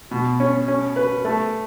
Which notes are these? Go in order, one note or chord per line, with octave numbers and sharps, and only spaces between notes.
B2
C#4
C#4
B4
A3